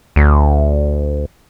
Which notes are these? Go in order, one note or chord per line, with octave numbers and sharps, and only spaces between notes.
D2